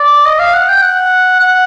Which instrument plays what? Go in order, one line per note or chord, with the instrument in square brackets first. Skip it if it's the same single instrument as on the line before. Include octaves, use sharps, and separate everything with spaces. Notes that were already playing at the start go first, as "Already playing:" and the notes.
Already playing: [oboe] D5
D#5
F5
F#5
G5
F#5
F#5